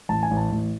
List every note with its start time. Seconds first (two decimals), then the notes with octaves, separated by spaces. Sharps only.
0.09 A1 A5
0.23 G#5
0.31 A1
0.37 A5
0.52 A1